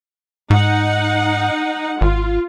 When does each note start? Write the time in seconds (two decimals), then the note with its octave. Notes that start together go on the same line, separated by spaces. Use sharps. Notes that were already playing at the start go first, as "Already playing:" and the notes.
0.50 G#2 D#4 F#5
2.01 G#1 F4